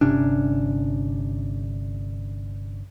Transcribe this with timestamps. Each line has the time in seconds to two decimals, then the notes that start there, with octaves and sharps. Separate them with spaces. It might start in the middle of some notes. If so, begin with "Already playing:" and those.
0.01 G1 C3 C#4 D4